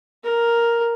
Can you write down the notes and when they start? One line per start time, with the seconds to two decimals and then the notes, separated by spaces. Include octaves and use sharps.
0.24 A#4